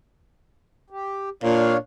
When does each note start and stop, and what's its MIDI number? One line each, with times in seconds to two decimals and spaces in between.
0.90 1.29 67
1.43 1.75 46
1.43 1.77 62
1.43 1.77 73
1.43 1.77 77